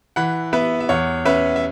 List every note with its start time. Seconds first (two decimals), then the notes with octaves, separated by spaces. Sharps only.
0.16 E3 F#5 B5
0.53 B3 B4 E5
0.80 E5
0.89 E2 C#5
1.25 C#4 B4 E5
1.56 E5